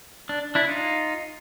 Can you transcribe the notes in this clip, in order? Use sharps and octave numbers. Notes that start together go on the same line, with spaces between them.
D4
D4 E4
D#4 F4